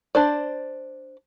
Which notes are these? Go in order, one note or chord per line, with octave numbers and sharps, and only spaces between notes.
D4 C5 D5